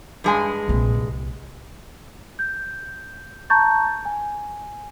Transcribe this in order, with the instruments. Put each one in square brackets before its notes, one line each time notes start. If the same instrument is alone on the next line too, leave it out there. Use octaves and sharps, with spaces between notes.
[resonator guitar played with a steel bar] G2 G#3 G#5
[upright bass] A#1 C3
C2
[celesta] G6
A5 A#5 C#6 G6 A6
G#5